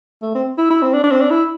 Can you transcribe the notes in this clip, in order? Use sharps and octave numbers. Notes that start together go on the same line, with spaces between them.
A3
C4
E4
E4
C4
D4
D4
C4
D4
E4